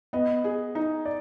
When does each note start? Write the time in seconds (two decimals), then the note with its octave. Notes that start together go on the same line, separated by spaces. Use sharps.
0.13 B3 D#5
0.44 G#4
0.75 D#4
1.05 D5